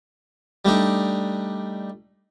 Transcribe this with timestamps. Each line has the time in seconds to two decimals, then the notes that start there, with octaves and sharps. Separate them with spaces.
0.65 G3 A3 D4 D#4